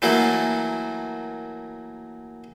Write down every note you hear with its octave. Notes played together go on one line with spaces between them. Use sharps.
E3 F#3 A3 A#3